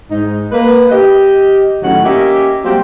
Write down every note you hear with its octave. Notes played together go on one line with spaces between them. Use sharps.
G#2 D#4
A#3 B4
G4 D#5
D2 A2 D#3 F#3 C#4 F#5
A#3 C#4 G4 D#5 E5
F#3 G3 A#3 C4 F#4 G4